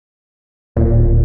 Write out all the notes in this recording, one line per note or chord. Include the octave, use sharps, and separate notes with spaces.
D1 A#2